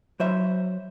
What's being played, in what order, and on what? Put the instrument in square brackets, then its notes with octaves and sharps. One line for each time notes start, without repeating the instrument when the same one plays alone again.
[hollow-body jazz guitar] F#3 C5 E5